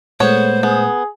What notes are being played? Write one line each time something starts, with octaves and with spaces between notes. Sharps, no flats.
A#2 G#3 A3 B3 C5 C#5
B3 G#4